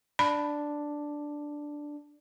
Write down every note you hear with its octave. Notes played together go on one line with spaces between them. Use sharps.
D4 B5